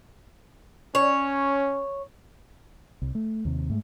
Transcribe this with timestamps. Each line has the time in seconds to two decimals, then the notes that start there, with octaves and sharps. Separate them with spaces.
0.95 C#4 C#5
3.02 C2
3.15 A3
3.45 D#2 C3
3.70 G#2 A3